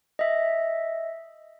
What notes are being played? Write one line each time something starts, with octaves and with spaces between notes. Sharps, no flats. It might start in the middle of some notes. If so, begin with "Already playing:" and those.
D#5 E5